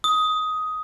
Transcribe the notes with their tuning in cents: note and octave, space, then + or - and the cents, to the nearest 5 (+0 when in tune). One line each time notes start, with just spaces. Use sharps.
D#6 +10